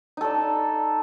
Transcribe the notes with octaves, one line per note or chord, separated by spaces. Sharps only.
D#4 A4 D5